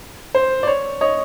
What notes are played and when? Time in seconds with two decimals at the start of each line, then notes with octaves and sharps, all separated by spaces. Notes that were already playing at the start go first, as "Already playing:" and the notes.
0.35 C5
0.63 D5
0.67 C#5
1.01 C#5 D#5